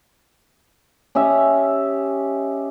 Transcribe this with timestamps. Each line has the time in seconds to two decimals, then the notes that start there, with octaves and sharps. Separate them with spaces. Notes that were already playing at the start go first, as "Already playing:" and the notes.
1.15 C#4 G4 D#5 E5